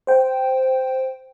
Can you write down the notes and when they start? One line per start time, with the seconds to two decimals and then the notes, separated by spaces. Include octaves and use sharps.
0.07 C5 G5